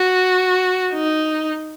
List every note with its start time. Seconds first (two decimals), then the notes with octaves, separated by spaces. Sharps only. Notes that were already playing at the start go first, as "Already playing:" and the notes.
Already playing: F#4
0.93 D#4